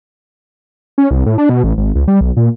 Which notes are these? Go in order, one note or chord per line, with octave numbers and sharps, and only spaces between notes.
C#4
C2
A2
D4
B2
A1
G#1
C#2
G3
B1
A#2